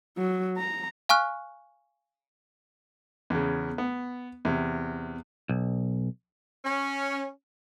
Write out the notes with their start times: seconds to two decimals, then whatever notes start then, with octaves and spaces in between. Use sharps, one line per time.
0.17 F#3
0.57 A#5
1.09 F5 G#5 C#6 F6 F#6
3.30 E2 C#3
3.78 B3
4.45 E2 C3
5.49 B1
6.65 C#4